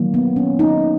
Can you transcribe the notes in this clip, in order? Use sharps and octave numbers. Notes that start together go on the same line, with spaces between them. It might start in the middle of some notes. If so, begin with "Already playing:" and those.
Already playing: D#3 F#3 A#3
B3
C#4
D#4